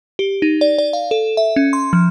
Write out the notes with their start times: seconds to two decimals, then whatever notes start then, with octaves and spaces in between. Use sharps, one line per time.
0.19 G4
0.42 D#4
0.61 D5
0.78 D5
0.93 F5
1.11 A4
1.37 E5
1.56 C#4
1.73 C6
1.93 F3